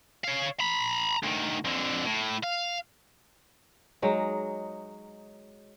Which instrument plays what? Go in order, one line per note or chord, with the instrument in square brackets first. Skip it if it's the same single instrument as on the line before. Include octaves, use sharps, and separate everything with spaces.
[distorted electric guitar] C#5 F5
A#5 B5
D2 D#3
F2 D3
A2
F5
[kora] F#3 G#3 D#4